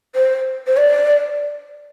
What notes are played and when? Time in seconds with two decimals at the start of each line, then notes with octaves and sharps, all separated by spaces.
0.15 C5
0.66 C5
0.77 D5